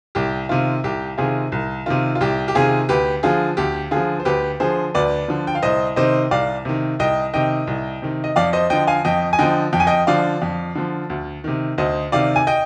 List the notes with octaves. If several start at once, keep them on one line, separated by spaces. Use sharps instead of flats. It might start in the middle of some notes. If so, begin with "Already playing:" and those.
C2 G4
C3 D#3 F4
C2 G4
C3 D#3 F4 G#4
C2
C3 D#3 F4
F4
C2 G4
G4
C3 D#3 F4 G#4
D2 G4 B4
D3 F3 F4 G#4
D2 G4
D3 F3 F4 G#4
C5
D2 G4 B4
D3 F3 G#4 C5
D2 B4 D5
D3 F3
G5
F5
C2 C5 D#5
C3 D#3 C5 D#5
C2 D5 F5
C3 D#3
C2 D#5 G5
C3 D#3 D#5 G5
C2
C3 D#3
D#5
F2 D5 F5
C5 D#5
D3 F3 D#5 G5
F5 G#5
F2 D#5 G5
G#5
D3 F3 D#5 G5
F2 G5
G#5
D#5 G5
D3 F3 D5 F5
F2
D3 F3
D2
C3 D#3
D2 C5 D#5
C3 D#3 D5 F5
G#5
D#5 G5